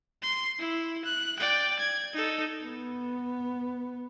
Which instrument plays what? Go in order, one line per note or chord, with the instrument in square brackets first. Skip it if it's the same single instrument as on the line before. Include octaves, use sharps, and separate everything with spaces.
[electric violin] C6
E4
F#6
D5 G5
G#6
D#4 A4
[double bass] B3